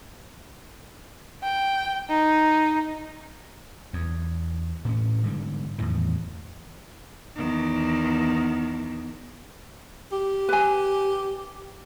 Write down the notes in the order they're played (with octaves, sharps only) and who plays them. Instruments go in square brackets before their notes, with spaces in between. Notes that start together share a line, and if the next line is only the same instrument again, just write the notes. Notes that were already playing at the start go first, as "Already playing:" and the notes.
[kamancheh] G5
D#4
[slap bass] E2
A2 C#4
G#2 D3 G3
E2 A2 D#3 E3
[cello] E2 D#3
[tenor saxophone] G4
[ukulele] B4 G#5